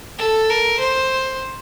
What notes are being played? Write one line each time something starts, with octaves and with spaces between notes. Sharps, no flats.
A4
A#4
C5